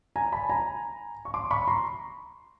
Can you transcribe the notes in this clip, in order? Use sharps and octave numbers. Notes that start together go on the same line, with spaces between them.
G#5 A#5
A5 B5
G#5 A#5
C#6
C6 D6
B5 C#6
A#5 C6